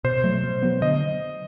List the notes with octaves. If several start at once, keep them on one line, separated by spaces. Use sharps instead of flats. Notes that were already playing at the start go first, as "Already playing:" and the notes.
B2 C5
F#3 A3
B2
F#3 B3
D3 D#5